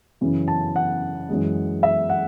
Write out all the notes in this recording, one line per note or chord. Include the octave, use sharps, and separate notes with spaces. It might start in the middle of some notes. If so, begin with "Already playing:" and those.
F#2 C#3 E3
A5
F#5
F#2 E3 G#3
E5
F#5